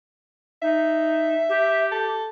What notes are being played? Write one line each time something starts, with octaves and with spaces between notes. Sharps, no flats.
D#4 E5
G4
A4